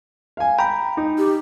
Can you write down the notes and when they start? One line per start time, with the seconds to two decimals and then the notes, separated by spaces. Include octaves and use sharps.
0.37 F5 G#5
0.59 G5 A#5 B5
0.97 D#4
1.18 G4